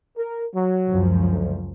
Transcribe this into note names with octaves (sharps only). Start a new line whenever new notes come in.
A#4
F#3
C#2 F#2 F3
D2